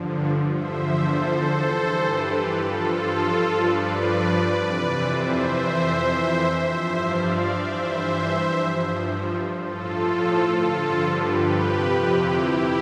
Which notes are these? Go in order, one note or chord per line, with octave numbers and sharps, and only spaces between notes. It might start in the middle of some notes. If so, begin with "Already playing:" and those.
Already playing: G2 D3 F3
E2 D3 F3 C5 E5
A4 C5
G2 E3
G4 B4
G2 F3 F4 A4
G2 F3 B4 D5
F2 C3 E3
C5 E5
F2 E3
G2 F3 C5 E5
D5 F5
G2 E3 C5 E5
G2 F3
A2 F3 F4 A4
G2 D3 F3 F4 A4
G4 B4
F2 C3 F3
E4 G4